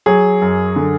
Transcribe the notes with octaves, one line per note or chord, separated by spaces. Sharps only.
F#3 G#4
F#2
D3